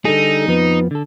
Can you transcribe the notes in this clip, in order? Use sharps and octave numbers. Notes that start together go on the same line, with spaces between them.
D3 G3 D#4 G#4 A4
F2 F3 B3
D3 A4